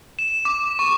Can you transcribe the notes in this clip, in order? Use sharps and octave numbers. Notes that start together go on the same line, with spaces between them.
E7
D6
C#6